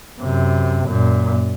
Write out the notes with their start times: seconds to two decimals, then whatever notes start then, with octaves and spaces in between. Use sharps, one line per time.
0.21 F#2 C3
0.86 F#2 A#2